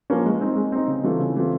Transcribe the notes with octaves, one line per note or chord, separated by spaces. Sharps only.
F3 A#3 C#4
G#3
C4 D#4
G#3
C4 D#4
C#3
E3 A3 C4 F4
C#3
E3 A3 C4 F4